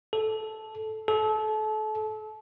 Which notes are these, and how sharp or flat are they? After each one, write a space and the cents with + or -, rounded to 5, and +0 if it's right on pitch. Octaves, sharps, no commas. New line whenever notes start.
A4 -10
A4 -30